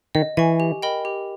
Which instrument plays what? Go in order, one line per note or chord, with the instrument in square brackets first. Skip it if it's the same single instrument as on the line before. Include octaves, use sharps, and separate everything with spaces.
[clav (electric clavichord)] D#3 [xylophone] D#5
[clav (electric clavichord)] E3 [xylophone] G#5 C#6
[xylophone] G4
A#4 D#5 G5 B5
G4